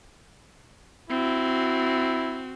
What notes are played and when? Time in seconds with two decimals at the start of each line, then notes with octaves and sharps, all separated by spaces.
1.10 C4 E4 F#4